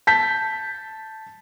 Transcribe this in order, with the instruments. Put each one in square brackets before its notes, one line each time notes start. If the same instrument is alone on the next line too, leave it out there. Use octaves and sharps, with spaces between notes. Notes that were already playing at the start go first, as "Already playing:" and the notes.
[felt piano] A5 G6 B6